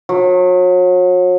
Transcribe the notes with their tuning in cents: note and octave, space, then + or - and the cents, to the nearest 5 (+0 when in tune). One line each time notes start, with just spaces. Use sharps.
F#3 -35